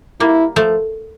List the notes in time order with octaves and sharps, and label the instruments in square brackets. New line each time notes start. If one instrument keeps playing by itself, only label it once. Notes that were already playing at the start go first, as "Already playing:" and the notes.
[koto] G3 A#3 [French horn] E4
[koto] F3 A3